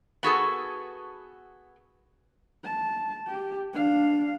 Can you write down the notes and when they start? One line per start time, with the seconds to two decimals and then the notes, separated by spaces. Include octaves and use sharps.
0.23 B3 F#4 G#4 A4
2.64 A5
3.27 G4
3.73 D4 F5